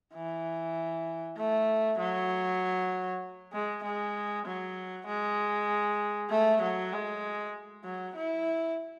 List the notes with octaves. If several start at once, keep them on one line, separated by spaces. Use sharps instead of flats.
E3
A3
F#3
G#3
G#3
F#3
G#3
A3
F#3
G#3
F#3
E4